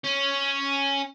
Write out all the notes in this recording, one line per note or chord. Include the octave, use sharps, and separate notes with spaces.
C#4